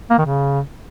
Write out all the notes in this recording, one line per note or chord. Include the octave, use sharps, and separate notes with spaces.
A#3
D#3
C#3